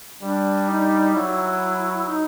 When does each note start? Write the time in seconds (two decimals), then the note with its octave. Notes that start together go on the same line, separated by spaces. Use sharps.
0.22 G3 D4
0.69 D#4
1.15 F#3 E4
2.08 D#4